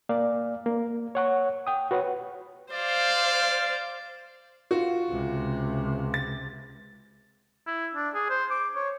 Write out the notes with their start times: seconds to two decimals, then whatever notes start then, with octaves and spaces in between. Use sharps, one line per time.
0.09 A#3 D5 F5
0.66 A#3
1.15 C#5 F#5 C#6
1.67 G5 D#6
1.91 F#4 B4 C#5 F#5
2.72 C5 D5 F5
4.71 F4 F#4
5.10 C#2 C3
6.14 A6
7.67 E4
7.95 D4
8.14 G#4
8.30 C5
8.51 D6
8.75 C#5